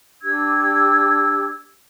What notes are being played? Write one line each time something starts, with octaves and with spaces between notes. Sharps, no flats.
D4 G4 E6 G#6